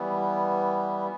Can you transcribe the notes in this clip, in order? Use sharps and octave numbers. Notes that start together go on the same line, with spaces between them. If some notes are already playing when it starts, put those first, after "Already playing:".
Already playing: E3 G3 B3